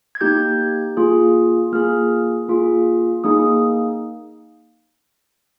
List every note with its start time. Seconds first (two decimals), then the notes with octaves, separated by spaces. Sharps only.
0.15 G#6
0.21 A#3 D#4 G4 G6
0.97 A#3 F4 G#4
1.72 A#3 F4 G#4 F6
2.48 A#3 F4 G#4
3.24 A#3 D#4 G#4 D#6